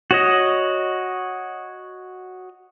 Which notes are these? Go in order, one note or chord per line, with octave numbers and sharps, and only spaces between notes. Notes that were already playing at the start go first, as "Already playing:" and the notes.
F#4 C#5 D#5